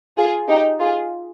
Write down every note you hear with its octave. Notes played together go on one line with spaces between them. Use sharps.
F4 G#4
D#4 G4
F4 G#4